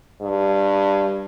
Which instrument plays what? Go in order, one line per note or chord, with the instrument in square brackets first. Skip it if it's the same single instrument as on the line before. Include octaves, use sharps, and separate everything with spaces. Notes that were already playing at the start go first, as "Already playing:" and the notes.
[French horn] G2